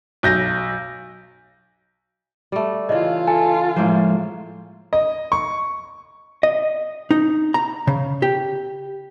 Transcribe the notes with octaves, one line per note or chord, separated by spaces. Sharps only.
B1 G6 A#6
G3 A3
C#3 E3 F4 D#5 F5
A4 G#5
A2 F3 G#3 A#3 C5
D#5
C#6
D#5
D#4
A#5
C#3
G4